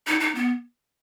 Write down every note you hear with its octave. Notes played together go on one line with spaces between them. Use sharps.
D#4
D#4
B3